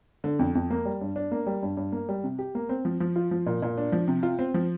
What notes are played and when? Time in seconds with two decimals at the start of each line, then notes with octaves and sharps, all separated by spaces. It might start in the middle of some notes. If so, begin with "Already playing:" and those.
0.24 D3
0.39 F2
0.55 F2
0.70 A#3
0.85 G3
1.01 G2
1.16 D4
1.31 A#3
1.47 G3
1.63 G2
1.77 G2
1.92 A#3
2.09 G3
2.24 C3
2.39 G4
2.55 A#3
2.69 C4
2.85 F3
3.00 F3
3.16 F4
3.31 F3
3.46 A#2
3.62 A#2
3.78 D4
3.92 F3
4.08 C3
4.23 F4
4.39 C4
4.54 F3